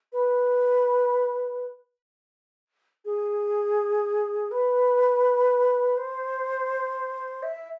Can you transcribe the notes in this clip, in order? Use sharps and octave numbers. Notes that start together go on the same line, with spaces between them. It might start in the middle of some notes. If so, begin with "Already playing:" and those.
B4
G#4
B4
C5
E5